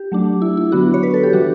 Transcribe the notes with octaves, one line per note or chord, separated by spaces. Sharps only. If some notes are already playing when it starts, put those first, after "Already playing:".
Already playing: G4
F#3 A3 D4
E4
E4
D3 F#3 B3 D4 F#4
C#5
B4
A4
G4
E3 G3 D4 F#4